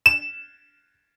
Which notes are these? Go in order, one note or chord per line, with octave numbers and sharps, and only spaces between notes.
E7